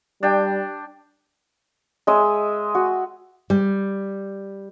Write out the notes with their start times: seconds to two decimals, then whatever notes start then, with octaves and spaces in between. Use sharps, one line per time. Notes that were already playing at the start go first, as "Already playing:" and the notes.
0.23 G3 D4 G5
2.07 G#3 D#5 E5 D#6
2.75 F#4
3.50 G3